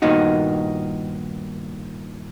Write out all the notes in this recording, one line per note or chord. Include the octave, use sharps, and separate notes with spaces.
G2 A#2 D#3 B3 D#4 F#4